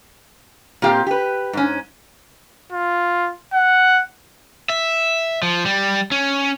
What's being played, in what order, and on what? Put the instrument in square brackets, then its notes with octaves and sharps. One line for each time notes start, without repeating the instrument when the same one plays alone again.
[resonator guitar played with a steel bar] A#2 C4 F4 G4 F5
G4 B4
G#2 C#4
[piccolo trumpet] F4
F#5
[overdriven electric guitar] E5
F3
G3
C#4